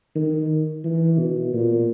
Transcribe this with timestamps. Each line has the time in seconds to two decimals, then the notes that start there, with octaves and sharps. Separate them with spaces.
0.15 D#3
0.84 E3
1.18 B2
1.54 A#2